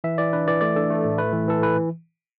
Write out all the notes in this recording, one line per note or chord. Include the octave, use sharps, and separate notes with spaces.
E3 E5
E3 D5
D4 B4
E3 D5
A3 D5
D4 A4
A3
A2
A3 B4
E3
E3 A4
E3 B4